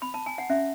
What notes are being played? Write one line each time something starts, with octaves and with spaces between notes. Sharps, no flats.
B5
A5
G#5
F#5
C#4 E5